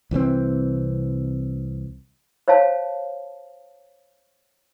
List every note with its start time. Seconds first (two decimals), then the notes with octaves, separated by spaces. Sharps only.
0.11 C2 E3 F3 C4
2.48 C5 C#5 F5 A5